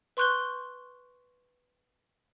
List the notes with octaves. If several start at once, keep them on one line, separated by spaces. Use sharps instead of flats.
B4 C6 C#6 F#6 G6 G7